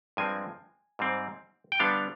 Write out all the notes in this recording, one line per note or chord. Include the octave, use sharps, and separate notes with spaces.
G2 F3 G#3 C4 G#5
G#2 G3 C4
G5
D3 G3 B3 D4 F5